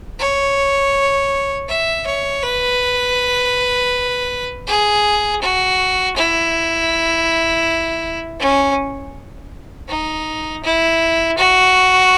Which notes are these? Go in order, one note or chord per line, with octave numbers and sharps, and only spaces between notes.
C#5
E5
C#5
B4
G#4
F#4
E4
C#4
D#4
E4
F#4